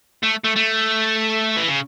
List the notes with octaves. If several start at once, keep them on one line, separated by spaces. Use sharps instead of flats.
A3
A3
A3
E3
C#3